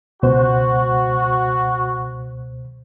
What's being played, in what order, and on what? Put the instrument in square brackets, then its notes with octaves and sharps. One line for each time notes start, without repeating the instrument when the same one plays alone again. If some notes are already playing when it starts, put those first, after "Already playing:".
[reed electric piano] C#2 B2 C5 [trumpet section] F#4